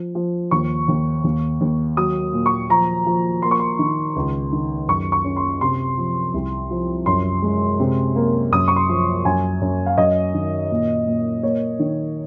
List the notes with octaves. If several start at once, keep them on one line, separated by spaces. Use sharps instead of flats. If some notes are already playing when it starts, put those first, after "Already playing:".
Already playing: F3
F3
D#2 C#6
D#2
D#2
D#2
F#3 D#6
A#2
C#6
F3 A#5
F3
A#3 C6
C#6
C6
D#3
C#2
D#3
F#2 C#6
C#6
C#4
C6
C3 C6
F3
C2
F3
F#2 C6
G#3
C3
A#3
F#2 D#6
C#6
C6
F3
F#2 G#5
F#2
F5
F#2 D#5
D#3
A#2
A#2
A#3 C#5
D#3